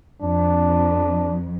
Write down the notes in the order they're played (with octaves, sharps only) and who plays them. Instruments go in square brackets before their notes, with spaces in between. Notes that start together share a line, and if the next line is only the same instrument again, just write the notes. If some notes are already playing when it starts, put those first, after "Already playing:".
[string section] F2 [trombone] D4